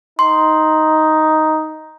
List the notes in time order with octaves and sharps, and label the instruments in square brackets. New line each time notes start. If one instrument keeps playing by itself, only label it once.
[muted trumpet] D#4 [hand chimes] C6